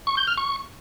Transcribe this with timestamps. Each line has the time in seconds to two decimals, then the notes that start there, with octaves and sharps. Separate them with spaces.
0.07 C#6
0.17 G6
0.27 F6
0.37 C#6